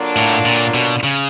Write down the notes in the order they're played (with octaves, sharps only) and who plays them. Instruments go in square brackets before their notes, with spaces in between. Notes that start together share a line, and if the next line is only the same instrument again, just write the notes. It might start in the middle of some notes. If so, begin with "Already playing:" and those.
Already playing: [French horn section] D3 F#3 A#3 D4 F4
[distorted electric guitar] A2
A#2
B2
C#3